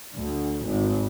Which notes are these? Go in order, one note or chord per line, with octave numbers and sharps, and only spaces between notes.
D2
G#1